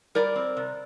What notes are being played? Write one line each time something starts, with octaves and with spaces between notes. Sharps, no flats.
G3 A#4 D5
C4
C3